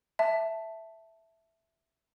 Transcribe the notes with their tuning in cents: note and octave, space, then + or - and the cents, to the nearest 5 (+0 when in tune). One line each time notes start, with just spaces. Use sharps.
E5 +0 A5 +0